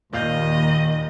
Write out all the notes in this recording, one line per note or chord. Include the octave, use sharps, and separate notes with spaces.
D#2 A#2 D#3 D#5 F5 G6